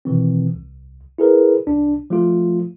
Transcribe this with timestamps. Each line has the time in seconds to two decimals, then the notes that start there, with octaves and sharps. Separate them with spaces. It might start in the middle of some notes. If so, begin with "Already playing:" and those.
0.05 B2 D#3 E3 C4
0.54 C2
1.18 E4 G#4 A#4 B4
1.66 C2 D4
2.10 F3 A3 F4